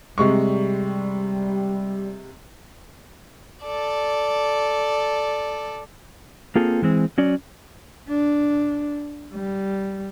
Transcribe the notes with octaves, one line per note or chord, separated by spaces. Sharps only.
C3 G3 G#3 C#6
A4 D5
A#3 C4 F4 G#4 A4
E3 G#3 C4
F#3 C#4 D5
D4
G3